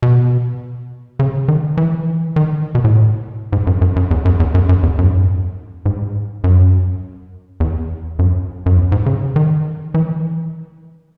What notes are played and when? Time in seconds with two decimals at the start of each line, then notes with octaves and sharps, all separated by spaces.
0.03 B2
1.19 C#3
1.48 D#3
1.77 E3
2.36 D#3
2.75 B2
2.84 A2
3.52 G#2
3.67 F#2
3.81 F#2
3.96 F#2
4.11 E2
4.25 F#2
4.40 E2
4.54 F#2
4.69 F#2
4.83 E2
4.98 F#2
5.06 G#2
5.15 F#2
5.86 G#2
6.44 F#2
7.60 E2
8.19 F#2
8.66 F#2
8.77 E2
8.92 G#2
9.06 C#3
9.36 D#3
9.94 E3